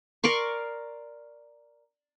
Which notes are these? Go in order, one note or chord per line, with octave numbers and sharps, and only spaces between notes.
A#4 D5 C6 C#6